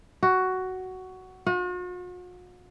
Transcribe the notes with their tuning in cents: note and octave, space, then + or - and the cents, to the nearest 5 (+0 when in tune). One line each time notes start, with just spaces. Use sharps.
F#4 +10
F#4 -45